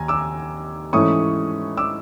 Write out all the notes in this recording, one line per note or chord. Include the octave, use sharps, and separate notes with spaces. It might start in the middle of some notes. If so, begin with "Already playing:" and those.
Already playing: D#2 G#5 A#5
D6 E6
G#2 E3 A3 C#4 E4 C#6 D#6
D6 E6